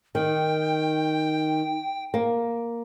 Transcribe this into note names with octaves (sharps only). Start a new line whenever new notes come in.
D#3 G5
A#3